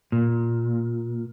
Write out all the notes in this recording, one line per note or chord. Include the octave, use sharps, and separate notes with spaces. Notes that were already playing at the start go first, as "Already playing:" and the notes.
A#2